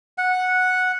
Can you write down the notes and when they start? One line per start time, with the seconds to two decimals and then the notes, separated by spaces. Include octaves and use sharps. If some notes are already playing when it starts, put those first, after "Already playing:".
0.18 F#5